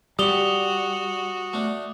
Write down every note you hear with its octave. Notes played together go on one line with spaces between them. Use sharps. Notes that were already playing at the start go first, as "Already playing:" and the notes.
G3 F#4 D5 D#6 F7 G7
A3 D4